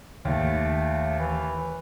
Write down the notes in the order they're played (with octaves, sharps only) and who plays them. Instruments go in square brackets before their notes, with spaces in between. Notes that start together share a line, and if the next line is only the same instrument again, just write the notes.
[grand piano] D#2 [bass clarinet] A3
[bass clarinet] E3